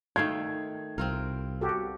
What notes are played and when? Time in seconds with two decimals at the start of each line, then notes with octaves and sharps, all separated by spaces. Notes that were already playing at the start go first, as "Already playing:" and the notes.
0.16 D#3 A3 F5 G5 G#6
0.98 C2 C4 F4 A#4
1.61 F#4 G4 A4